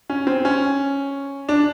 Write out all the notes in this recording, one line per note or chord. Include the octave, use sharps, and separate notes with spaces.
C#4
C4
C#4
D4